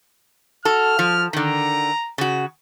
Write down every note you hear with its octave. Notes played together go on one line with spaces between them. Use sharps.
F#4 A4 F6
F3
D3 D#3 A#5
C#3 F#4